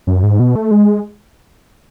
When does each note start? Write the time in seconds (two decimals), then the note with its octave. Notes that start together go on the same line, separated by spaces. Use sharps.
0.07 F#2
0.23 G#2
0.40 B2
0.56 A3
0.71 G#3